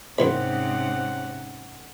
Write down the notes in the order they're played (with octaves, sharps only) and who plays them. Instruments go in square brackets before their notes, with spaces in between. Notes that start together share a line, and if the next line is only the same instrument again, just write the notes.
[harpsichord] A1 D#2 B5 [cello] G#2 C3 [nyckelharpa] C#4 F#5 [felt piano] C5